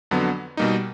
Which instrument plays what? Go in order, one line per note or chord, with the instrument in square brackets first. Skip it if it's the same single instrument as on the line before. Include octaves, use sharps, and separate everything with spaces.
[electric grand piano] F2 D3 F#3 B3
B2 G3 A#3 D#4